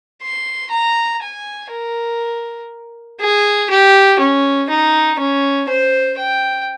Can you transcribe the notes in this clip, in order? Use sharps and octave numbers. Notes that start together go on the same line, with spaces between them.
C6
A#5
G#5
A#4
G#4
G4
C#4
D#4
C#4
C5
G5